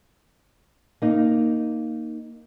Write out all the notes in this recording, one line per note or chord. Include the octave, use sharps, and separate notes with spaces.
A#3 D#4